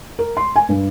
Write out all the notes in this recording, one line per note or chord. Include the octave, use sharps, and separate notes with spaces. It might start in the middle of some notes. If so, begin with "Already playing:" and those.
A#4
C6
G#5
G2